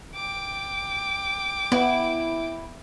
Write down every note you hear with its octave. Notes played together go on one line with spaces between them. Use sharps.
G5 D6
B3 E4